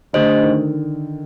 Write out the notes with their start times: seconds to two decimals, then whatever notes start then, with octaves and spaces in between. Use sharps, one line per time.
0.13 D3 A3 D4 G4 C5 D#5
0.43 D#3